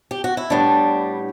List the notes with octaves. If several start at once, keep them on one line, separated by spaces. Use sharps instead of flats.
G4
F#4
E4
A2 G3 B3 D4